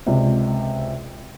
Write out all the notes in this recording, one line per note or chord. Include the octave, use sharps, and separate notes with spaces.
C#2 C3 G#3 D5